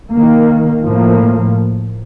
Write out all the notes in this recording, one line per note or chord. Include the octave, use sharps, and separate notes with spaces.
D#3 A#3
A2 F3 A#3